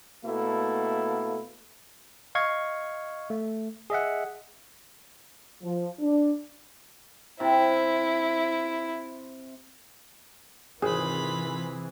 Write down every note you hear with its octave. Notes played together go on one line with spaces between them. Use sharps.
B2 A3 A#3 E4 A4
D#5 F5 C#6 G#6
A3
G#4 D#5 E5 F#5
F3
D4
C3 E4
G#1 C3 E3 F4 G#4 B5